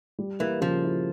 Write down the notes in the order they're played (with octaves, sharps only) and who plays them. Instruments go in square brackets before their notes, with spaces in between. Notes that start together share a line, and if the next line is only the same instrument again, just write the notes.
[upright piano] G3
[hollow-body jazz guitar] E3 [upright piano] A#3
[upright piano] C#3 [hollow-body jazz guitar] F3
[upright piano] E4